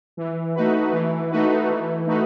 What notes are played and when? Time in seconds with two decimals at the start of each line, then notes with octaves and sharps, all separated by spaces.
0.17 E3
0.55 A3 D#4 F#4 B4
0.92 E3
1.31 A3 D#4 F#4 B4
1.69 E3
2.07 A3 D#4 F#4 B4